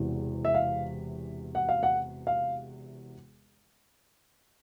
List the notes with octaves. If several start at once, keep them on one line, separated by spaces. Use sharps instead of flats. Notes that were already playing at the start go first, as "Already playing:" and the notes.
Already playing: E1 E2 C3 E3
E5
F5
F#5
F5
F#5
F5